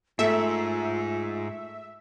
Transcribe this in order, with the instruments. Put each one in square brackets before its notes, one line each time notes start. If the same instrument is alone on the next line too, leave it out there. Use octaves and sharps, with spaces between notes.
[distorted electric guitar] G#2 [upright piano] A3 [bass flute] F4 [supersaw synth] E5